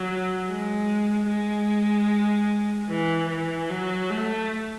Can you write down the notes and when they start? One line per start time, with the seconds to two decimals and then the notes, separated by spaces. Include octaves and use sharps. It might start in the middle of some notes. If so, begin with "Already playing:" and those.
Already playing: F#3
0.47 G#3
1.28 G#3
2.89 E3
3.29 E3
3.69 F#3
4.10 A3